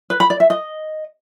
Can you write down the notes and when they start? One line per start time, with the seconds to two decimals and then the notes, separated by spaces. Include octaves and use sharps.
0.10 B4
0.20 B5
0.30 D5
0.40 E5
0.50 D#5